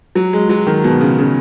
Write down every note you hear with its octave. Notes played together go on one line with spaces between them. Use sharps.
F#3
G#3
F#3
D#3
B2
C#3
C#3